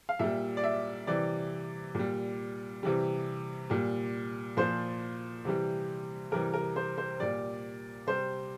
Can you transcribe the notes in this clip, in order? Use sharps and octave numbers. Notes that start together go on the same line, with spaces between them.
F5
A#2 G3 E5
D5
E5
C3 E3 G3 D5
A#2 G3
C3 E3 G3
A#2 G3
A#2 F3 C5
C3 E3 G3
C3 E3 G3 A#4
A#4
C5
C5
A#2 G3 D5
C3 G3 C5